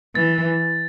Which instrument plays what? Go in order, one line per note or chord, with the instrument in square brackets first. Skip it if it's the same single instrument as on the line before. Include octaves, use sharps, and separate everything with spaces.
[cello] E3 [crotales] A6